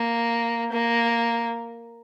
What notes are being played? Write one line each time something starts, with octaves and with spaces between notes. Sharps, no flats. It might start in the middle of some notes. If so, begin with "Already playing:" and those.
Already playing: A#3
A#3